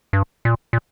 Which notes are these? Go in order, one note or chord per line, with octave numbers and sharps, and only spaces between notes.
G2
A#2
A#2